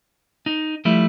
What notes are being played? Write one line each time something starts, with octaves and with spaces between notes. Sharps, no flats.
D#4
F3 G3 A3 E4